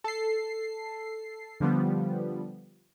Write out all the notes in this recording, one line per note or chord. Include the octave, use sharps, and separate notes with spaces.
A4 C7
D3 F3 G3 B3